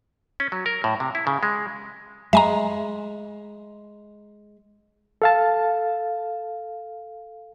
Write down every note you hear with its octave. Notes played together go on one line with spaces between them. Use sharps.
C#4
F#3
A#4
A2
C3
E4
C#3
G#3
G#3 E5 G#5 A#5
A4 F5 A5